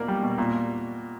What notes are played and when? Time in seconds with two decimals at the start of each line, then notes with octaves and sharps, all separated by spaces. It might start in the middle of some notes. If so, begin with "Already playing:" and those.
Already playing: B2 A#3 D5
0.08 G3
0.23 B2
0.38 A#2